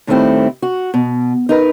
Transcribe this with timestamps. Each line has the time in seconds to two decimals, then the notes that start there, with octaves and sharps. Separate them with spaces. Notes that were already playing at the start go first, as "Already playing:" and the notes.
0.07 A2 D#3 G3 A3 C4 E4
0.62 F#4
0.94 B2
1.49 D#4 A#4 B4